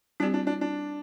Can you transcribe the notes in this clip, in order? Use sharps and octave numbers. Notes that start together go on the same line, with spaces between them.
G3 C4 D4 G4
D4
D4
D4